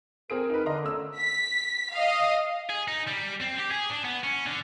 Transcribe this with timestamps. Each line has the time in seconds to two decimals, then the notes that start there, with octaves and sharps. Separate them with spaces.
0.30 C4 G#4 A#4 D7
0.50 D#4 B4
0.66 D3 D#5 A#5 C6
0.82 A3 C#4 E6
1.18 B6
1.94 D#5 F5
2.70 G#4
2.88 D#4
3.07 G3
3.40 C4
3.58 G4
3.71 G#4
3.90 D4
4.05 B3
4.23 C#4
4.46 D3